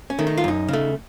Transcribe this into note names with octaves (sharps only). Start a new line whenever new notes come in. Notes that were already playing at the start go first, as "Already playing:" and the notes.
C#4
D#3 A3
D#4
F4
F#2 D#4
C#3 A3